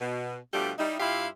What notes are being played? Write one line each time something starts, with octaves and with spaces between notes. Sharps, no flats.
B2
B2 F3 G3 A3 D4 G4
G3 D#4 E4
G2 E4 F4 G4 E5 F5